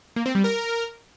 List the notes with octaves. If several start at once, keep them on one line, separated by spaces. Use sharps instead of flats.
A#3
C4
G3
A#4